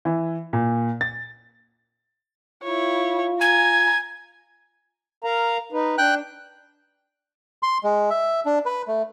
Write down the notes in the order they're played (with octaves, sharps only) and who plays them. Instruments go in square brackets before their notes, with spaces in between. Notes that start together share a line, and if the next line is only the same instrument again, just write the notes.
[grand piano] E3
A#2
A6
[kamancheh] E4 C#5 [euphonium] F4
[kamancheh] G#5 A#5 [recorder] G#6
[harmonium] A#4 F5 A#5
D#4 B4
[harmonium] D4 [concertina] G5 F#6
[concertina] C6
G#3
E5
D4
B4
A3